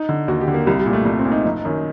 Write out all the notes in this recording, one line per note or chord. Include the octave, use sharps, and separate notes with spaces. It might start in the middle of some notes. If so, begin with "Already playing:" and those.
Already playing: D#4
D3
D#2 F#4
G4
D3
A#3
C2 G3
G3
A#2
A3
C2
C4
A#2
D#4
F#1
F#2 D#3